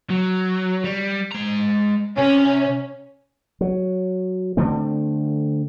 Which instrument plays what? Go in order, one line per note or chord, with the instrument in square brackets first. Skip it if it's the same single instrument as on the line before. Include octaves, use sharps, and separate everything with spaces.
[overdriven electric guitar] F#3
G3
G#3 A#5
[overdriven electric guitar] C3 [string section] C#4
[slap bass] F#3
D3 A3 C4